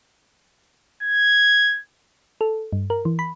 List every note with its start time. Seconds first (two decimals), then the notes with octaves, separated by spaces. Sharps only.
1.03 G#6
2.41 A4
2.73 G2
2.90 A#4
3.05 E3
3.19 B5